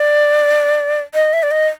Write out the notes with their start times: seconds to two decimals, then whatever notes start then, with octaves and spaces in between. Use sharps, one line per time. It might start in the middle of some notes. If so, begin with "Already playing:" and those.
Already playing: D5
1.15 D#5
1.33 E5
1.43 D5
1.51 D#5